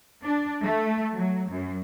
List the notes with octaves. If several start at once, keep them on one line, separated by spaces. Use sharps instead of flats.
D4
A3
F#3
F#2